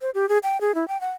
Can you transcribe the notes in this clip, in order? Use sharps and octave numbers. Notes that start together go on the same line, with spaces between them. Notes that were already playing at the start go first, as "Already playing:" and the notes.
C5
G4
G#4
G5
G#4
E4
G5
F#5